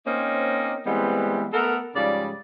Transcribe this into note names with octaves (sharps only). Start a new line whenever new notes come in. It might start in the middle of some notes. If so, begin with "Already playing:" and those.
A#3 C4 C#4 D#4 C5
E3 G3 G#3 B3 C4
A3 B3 A4 A#4
G#2 C#3 F3 G3 D5